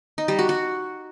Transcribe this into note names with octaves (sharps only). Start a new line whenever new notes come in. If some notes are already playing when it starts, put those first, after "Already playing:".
D#4
G3
F#4
F#4